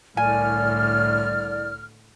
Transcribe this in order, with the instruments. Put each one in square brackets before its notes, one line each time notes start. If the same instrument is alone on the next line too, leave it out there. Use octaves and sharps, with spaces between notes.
[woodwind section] C2 F6 [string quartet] A2 D3 [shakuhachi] D5 [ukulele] G#5